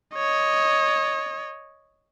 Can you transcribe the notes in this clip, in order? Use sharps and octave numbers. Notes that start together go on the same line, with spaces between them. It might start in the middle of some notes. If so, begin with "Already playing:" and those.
C#5 D#5